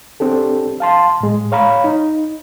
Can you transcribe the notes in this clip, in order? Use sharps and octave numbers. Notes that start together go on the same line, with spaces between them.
C4 D4 G4 A4
F5 A5 C6
A2 G#3
C#5 F5 A#5 B5
D#4